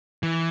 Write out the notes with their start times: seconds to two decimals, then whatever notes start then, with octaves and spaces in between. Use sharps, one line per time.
0.23 E3